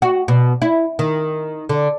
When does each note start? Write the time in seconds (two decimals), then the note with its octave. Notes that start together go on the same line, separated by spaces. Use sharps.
0.02 F#4
0.28 B2
0.62 E4
0.99 D#3
1.69 D3